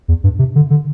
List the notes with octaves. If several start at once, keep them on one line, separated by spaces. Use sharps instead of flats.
E2
G2
C3
D3
D3